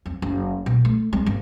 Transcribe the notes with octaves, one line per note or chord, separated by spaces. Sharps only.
F2
F#1
B2
A3
G#3 C4
G1